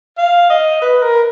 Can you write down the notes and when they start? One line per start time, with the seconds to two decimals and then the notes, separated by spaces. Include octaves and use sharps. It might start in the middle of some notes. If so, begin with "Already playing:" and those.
0.18 F5
0.50 D#5
0.82 B4
1.03 A#4